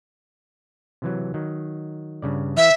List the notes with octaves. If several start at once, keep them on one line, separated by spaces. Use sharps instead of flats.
C3 E3 F#3
D#3 F#3
G2 C#3 D5
E3 E5 F5